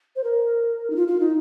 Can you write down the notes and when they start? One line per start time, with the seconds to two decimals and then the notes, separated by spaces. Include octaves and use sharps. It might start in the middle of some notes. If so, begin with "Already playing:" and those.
0.16 C5
0.24 A#4
0.90 D#4
0.96 F4
1.08 F4
1.20 D#4